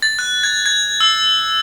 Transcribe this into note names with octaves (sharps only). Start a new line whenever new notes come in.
A6
F#6
G#6
G#6
E6